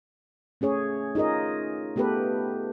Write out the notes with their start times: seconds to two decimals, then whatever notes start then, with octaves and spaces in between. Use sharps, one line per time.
0.61 A3 C#4 G#4 C#5
1.15 D#4 F4 G#4 A#4 D#5
1.96 A3 B3 G4 A4 B4